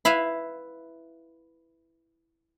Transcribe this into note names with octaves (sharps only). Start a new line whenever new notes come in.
E4 B4 E5 F5